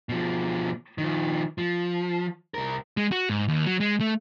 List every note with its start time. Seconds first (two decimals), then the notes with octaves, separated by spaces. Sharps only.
0.09 B2 F3
0.98 D#3 F3
1.58 F3
2.54 C2 A#4
2.97 G#3
3.12 F#4
3.29 G#2
3.48 D#2
3.66 F#3
3.80 G#3
4.00 A3